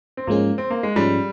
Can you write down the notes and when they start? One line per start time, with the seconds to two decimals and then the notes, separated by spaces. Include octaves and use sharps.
0.17 C4
0.27 G#2 F3 G#3 A#3 C#4 G#4
0.58 C4
0.70 A#3
0.83 G#3
0.96 G#2 F3 G3 G#3 C#4 G#4